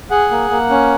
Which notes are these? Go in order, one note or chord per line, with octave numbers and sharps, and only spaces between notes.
G#4 F#5
A#3
A#3
C#4